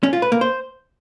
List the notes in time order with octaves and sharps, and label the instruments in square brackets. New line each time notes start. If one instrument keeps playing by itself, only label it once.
[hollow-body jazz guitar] C#4
F4
B4
A#3
C5